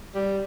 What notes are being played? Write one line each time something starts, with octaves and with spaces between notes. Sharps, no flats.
G3